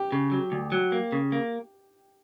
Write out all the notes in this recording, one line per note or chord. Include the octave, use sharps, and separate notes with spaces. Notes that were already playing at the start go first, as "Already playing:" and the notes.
Already playing: G4
C#3
F#3
D2
F#3
A#3
C#3
A#3